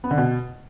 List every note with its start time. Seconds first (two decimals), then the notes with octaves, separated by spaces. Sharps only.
0.04 B3
0.11 D3
0.18 B2